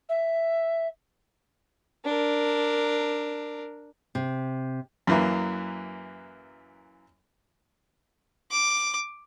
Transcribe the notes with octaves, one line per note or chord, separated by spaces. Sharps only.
E5
D4 A#4
C3
F#2 E3 A#3
D6